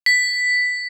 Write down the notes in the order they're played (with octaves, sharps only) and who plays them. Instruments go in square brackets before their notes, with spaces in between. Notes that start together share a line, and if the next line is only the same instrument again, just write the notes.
[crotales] B6